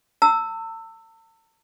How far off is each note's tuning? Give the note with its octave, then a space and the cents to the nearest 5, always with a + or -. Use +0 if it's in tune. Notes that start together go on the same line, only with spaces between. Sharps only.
A5 +45 E6 +0